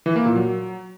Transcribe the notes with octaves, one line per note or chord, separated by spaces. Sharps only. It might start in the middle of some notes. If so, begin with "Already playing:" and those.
E3
A#3
A#2
F#3